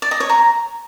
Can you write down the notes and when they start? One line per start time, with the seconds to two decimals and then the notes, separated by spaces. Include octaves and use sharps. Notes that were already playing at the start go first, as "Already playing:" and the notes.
0.02 D5
0.11 D#5
0.20 C#5
0.29 A#5